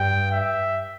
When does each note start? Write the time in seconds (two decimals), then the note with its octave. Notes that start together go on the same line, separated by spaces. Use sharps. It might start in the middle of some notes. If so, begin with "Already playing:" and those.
Already playing: G2 G5
0.32 E5